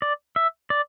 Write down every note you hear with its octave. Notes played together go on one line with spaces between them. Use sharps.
D5
E5
D5